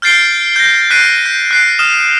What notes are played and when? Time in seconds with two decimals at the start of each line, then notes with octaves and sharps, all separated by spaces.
0.02 F6 G6 A6 C7 D7 G7
0.56 G6 A#6
0.91 F#6 G6 B6 C7 D7 D#7
1.26 G6
1.51 F#6 C7 D7
1.79 D#6 F6 E7